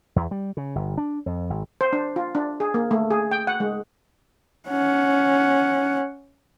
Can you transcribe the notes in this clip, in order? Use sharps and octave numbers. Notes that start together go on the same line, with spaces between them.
E2
G3
C#3
G1
D4
F2
G#1
C5
D4
F4
D4
G#4
A#3
A3
G#4
G5
F#5
G#3
C#4 F#5